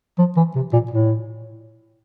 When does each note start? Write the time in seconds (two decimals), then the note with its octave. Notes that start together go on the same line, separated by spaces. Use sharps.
0.19 F3
0.37 E3
0.55 C3
0.73 A#2
0.91 A2